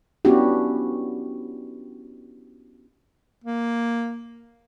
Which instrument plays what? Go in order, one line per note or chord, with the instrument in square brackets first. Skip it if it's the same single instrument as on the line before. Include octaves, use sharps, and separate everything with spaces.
[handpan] B3 C#4 D4 E4 F#4 G4
[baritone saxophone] A#3